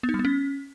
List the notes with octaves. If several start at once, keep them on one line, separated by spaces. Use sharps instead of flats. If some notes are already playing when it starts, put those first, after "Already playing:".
B3
D#4
G3
B3
C#4